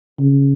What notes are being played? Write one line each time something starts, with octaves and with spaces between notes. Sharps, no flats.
C#3